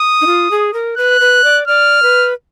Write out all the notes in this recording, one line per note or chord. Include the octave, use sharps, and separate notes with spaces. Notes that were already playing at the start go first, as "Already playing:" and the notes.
Already playing: D#6
D#4
F4
G#4
A#4
B4 F#6
B4
D5
D5 F6
B4